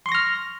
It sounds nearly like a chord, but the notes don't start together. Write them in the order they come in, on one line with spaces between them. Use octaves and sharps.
C6 C#6 A#6 F6